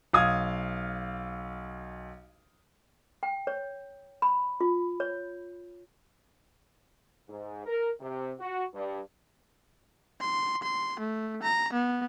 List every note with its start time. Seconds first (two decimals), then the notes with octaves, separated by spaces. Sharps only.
0.13 B1 F5 D#6 G#6
3.23 G5
3.47 C#5
4.22 B5
4.61 F4
5.00 C#5
7.28 G#2
7.66 A#4
8.00 C3
8.39 F#4
8.73 G2
10.20 C6
10.63 C6
11.00 A3
11.42 A#5
11.73 B3